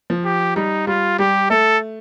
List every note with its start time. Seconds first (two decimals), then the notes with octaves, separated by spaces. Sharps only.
0.10 F3
0.25 G4
0.56 G3 D#4
0.87 G3 F4
1.19 G3 G4
1.50 A3 A4